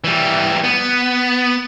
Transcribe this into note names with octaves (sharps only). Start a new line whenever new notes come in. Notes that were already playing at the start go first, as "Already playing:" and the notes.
E3 G3
B3